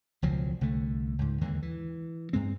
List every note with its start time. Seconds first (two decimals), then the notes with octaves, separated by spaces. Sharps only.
0.22 E1 C#2 F3 F#3
0.61 C2 D3 A3
1.19 C#2 G#2
1.41 D#2 D3 E3 G#3
1.62 E3
2.33 G2 G#3 C4